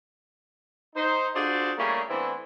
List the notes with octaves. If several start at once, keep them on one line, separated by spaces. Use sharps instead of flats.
D#4 C5
D4 F4 F#4 G#4 A4 C5
G3 A3 A#3 C#4 E4 G#4
E3 A3 B3 C4 D4 E4